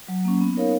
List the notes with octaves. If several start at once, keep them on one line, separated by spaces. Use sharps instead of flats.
F#3
A#3 C#4
B3
D#4 A#4 C#5 F5